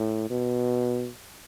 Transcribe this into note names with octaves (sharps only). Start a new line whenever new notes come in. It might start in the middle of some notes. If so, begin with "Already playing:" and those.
Already playing: A2
B2